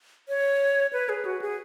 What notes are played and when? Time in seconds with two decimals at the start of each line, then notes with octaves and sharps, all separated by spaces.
0.29 C#5
0.93 B4
1.09 G#4
1.25 F#4
1.42 G#4